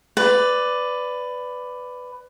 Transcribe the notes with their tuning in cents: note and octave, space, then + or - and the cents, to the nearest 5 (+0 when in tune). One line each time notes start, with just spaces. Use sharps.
B4 +15 D5 +0